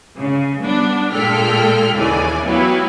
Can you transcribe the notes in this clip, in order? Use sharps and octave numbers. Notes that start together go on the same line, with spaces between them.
C#3
G3 B3 D4
A#2 G#3 A4 G5 F6 B6
D#2 C#3 E3 D5 G#5
F#3 B3 E4 G4 B4 F5